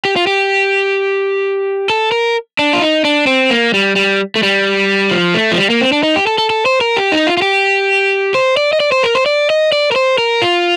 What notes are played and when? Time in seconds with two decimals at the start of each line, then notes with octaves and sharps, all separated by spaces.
0.05 G4
0.16 F4
0.27 G4
1.90 A4
2.12 A#4
2.59 D4
2.73 F4
2.81 D#4
3.05 D4
3.27 C4
3.50 A#3
3.74 G3
3.96 G3
4.36 A3
4.43 G3
5.11 F3
5.34 A3
5.52 F3
5.57 G3
5.70 A#3
5.81 C4
5.92 D4
6.03 D#4
6.16 G4
6.27 A4
6.38 A4
6.50 A4
6.66 C5
6.81 A#4
6.97 G4
7.12 D#4
7.27 F4
7.37 F4
7.42 G4
8.34 C5
8.57 D5
8.73 D#5
8.80 D5
8.92 C5
9.03 A#4
9.15 C5
9.26 D5
9.50 D#5
9.72 D5
9.92 A#4
9.96 C5
10.18 A#4
10.42 F4